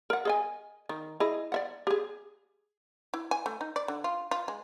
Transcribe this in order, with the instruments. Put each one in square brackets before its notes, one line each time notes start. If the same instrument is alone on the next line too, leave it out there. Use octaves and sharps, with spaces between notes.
[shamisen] A#4 F#5
G#4 D#5 G#5
D#3
E4 G#4 D#5
D5 E5 F#5
G4 G#4
E4
G#5
A3
D#4
D5
D3
F4
F4
G#3